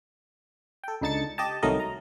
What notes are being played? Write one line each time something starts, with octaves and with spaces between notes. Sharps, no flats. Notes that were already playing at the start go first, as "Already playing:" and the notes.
A4 G5
C#2 D3 D#4 A5 A6 C#7
G4 D#5 G5 A5
C2 D#3 F#3 A3 A#4 D#5
A#5